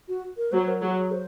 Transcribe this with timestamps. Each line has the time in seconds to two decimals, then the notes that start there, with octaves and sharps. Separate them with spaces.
0.08 F#4
0.37 A#4
0.52 F#3 C5
0.68 A#4
0.82 F#3 G#4
1.12 C5